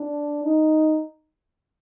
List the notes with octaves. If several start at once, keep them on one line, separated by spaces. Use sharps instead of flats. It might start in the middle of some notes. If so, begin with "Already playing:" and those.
Already playing: D4
D#4